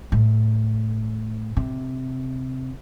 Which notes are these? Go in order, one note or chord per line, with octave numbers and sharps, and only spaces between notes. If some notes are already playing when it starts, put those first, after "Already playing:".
A2
C3